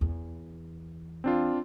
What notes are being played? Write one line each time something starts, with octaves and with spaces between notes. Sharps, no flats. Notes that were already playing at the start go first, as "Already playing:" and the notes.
E2
C4 D4 F4